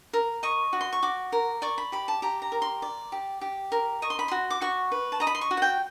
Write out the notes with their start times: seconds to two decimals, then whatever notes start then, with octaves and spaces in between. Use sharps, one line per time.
0.13 A#4
0.43 D#5 C#6
0.73 F#4
0.81 C6
0.93 C#6
1.02 F#4 D6
1.32 A#4
1.62 D5 C#6
1.78 B5
1.92 G4 B5
2.08 A5
2.22 G4 A#5
2.42 A#5
2.52 A#4
2.62 C6
2.82 D5
3.12 G4
3.41 G4
3.72 A#4
4.02 D#5 C#6
4.10 C6
4.19 B5
4.28 F#4 C6
4.50 D6
4.61 F#4 C#6
4.92 B4
5.12 A5
5.20 D#5 A#5
5.27 B5
5.35 C6
5.41 C#6
5.51 F#4
5.57 F#5
5.62 G5